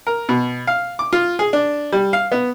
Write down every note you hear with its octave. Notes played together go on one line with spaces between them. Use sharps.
A#4
B2
F5
D6
F4
G#4
D4
G3
F5
B3